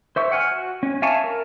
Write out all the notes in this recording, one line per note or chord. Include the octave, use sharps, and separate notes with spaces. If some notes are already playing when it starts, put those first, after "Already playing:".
C5 E5 C#6
F#5 G#5 F6
F#4
C#4
E5 F5 G#5 A5 C#6
A#4